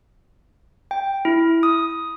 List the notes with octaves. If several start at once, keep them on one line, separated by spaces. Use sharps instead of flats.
G5
E4
D#6